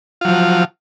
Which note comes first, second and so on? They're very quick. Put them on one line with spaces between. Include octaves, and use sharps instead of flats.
F4 F#3 F3